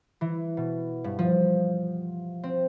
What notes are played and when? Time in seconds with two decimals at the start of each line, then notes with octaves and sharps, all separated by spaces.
0.21 E3
0.57 B2
1.04 G2
1.19 F3
2.44 C4